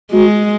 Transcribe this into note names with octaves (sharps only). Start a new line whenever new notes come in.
G#3 F#4